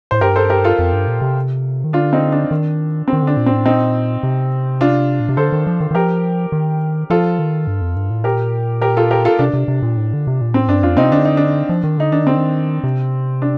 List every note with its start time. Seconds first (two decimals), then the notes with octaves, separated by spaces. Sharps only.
0.11 A2 C5
0.21 G2 G4 A#4
0.36 A4 C5
0.50 G4 A#4
0.64 F4 A4
0.79 F2
0.93 G2
1.07 A#2
1.22 C3
1.84 D#3
1.93 D3 D4 F4
2.13 C4 D#4
2.32 D4
2.51 D#3
3.08 C4
3.13 D#3
3.22 D3 D4
3.37 A#2
3.46 A2 C4
3.66 A#2 C4 D#4
4.23 C3
4.81 D4 F4
5.20 A#2
5.29 C3
5.37 D3 A4 C5
5.52 D#3
5.67 F3
5.80 D#3
5.91 D#3
5.95 F3 G4 A#4
6.52 D#3
7.10 F3 F4 A4
7.39 D#3
7.67 G2
7.81 F2
7.96 G2
8.10 A2
8.24 A#2 G4 A#4
8.81 G4 A#4
8.97 F4 A4
9.11 G4 A#4
9.25 F4 A4
9.39 C3 D4
9.54 C3
9.68 C3
9.82 A#2
9.97 A2
10.13 D3
10.27 C3
10.41 A#2
10.54 A2 C4
10.68 G2 D4
10.83 F2 D4 F4
10.97 C3 C4 D#4
11.11 D3 D4
11.25 D#4
11.37 D4
11.69 F3
11.84 D#3
11.98 D3 D#4
12.12 D#3 D4
12.24 D3 C4
12.36 D#3
12.84 C3
13.42 D4